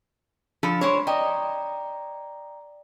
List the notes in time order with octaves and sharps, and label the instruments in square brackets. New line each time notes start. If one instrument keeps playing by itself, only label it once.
[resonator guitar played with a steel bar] F3 A4 [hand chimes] D4 B5
[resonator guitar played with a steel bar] G#3 C5 C#5
[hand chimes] D5 G5 A#5 [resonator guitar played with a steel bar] D#5